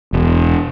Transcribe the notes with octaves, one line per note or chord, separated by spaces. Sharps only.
E1